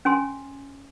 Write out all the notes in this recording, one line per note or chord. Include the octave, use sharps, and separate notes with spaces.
C#4 G#5 C6